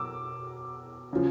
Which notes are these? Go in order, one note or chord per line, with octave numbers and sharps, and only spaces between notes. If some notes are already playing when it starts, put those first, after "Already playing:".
Already playing: B2 F#3 D6 E6
C#3 F3